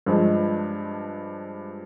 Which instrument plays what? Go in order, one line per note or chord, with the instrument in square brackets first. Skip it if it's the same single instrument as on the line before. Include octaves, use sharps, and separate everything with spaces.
[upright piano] G2 F3 G#3